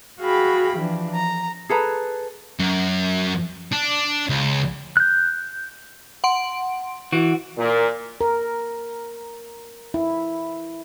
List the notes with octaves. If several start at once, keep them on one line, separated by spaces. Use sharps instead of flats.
F#4 G#4 F5 G5 B5
E3 F3 D4
A#5
G#4 A4 B4 A#5
F#2
D4
C#2
F#6 G6
F#5 C6 D7
E3 F#4 D7
A#2
A#4
E4